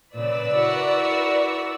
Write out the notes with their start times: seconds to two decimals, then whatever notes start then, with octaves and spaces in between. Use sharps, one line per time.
0.14 A#2 C#3 B4 D5 E6
0.52 E4 F#4 A#4